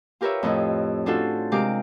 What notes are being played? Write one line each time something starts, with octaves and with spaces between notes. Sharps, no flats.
F4 G4 A#4 B4 C#5 E5
F2 A2 D#5
C#4 D4 F4 F#4 A4 C5
C3 G#3 G4 A#4 F5 D6